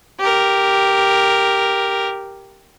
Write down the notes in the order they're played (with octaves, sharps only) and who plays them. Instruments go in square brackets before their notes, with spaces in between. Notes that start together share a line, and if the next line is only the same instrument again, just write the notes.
[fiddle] G4 A#4